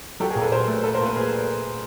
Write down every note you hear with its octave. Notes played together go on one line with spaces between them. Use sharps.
F#3 G4 A4
G#4 A#4
A#2
A4 B4
A#2 A#4 C5
A3
F#3 A4 B4
A#4 C5
A#2 A4 B4
A#2 G#4 A#4